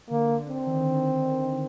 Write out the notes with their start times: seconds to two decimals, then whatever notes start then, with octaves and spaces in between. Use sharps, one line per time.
0.10 D3 A#3
0.29 D3
0.47 D3 C4
0.67 D#3